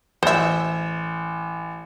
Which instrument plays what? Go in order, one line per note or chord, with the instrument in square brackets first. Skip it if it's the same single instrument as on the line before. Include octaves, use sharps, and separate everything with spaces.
[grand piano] A1 [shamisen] C5 E5